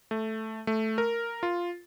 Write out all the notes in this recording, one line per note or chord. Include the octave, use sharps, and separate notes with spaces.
A3
A3
A#4
F4